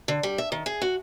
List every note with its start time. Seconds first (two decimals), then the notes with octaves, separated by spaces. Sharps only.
0.08 D3
0.23 G3
0.38 E5
0.52 D#3
0.66 G#4
0.82 F#4